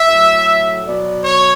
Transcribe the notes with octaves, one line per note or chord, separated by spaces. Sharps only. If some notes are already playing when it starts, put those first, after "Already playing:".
Already playing: E5
A2 F#3
B2 F#3 D5
C#5